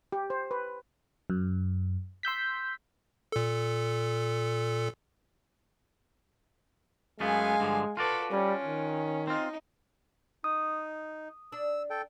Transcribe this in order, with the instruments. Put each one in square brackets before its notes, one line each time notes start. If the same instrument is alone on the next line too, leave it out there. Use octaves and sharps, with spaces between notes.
[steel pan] G4
C5
B4
[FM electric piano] F#2
C6 E6 G6 B6
[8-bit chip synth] A#2 A4
[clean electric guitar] F#2 A3 B3 [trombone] G#3 [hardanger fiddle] F5 G#5
[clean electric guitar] G2 D3 F3
[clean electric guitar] F4 F#4 D5 [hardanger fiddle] A4 B4
[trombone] G3 [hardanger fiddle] C#4
[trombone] D#3
[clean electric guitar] C4 F4 [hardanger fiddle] D#4
[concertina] D#4 [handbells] D#6
[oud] D4 [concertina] E6
[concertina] A4 G5